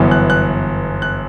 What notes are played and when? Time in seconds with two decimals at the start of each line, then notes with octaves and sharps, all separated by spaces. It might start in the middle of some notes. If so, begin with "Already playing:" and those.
Already playing: G1 F#2 E3 B3
0.11 F#6
0.30 F#6
1.02 F#6